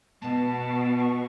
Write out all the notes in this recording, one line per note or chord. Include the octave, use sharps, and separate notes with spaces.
B2 A5
C#6